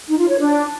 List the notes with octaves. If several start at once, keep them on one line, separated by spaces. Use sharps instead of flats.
D#4
F4
C#5
D4